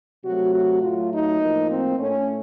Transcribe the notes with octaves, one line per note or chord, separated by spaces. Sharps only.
C3 F#3 A3 F#4
F#4
A2 F#3 A3 F4
D#4
A2 F3 A#3
C4
A2 A3 C#4